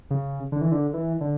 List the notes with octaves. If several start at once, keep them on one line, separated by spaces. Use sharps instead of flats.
C#3
D3
E3
D3
E3
D3